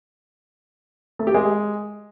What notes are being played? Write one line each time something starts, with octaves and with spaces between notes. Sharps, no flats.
A3
G4
G#3